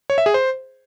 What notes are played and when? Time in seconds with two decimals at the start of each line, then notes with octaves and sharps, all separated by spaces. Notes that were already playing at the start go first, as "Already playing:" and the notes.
0.10 C#5
0.18 E5
0.26 G#4
0.34 C5